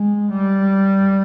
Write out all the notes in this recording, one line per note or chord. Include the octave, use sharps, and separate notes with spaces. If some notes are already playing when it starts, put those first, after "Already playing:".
Already playing: G#3
G3